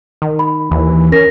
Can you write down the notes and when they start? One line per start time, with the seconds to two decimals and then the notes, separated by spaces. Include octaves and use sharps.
0.22 D#3
0.39 B5
0.71 D#2 E3
1.12 C#4 A#4 A#6